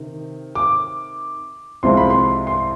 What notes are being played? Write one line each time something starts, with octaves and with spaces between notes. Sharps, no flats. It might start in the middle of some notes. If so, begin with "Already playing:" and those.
Already playing: C3 D#3
D6
C2 C3 F3 G#3 C6
B5
C6
C6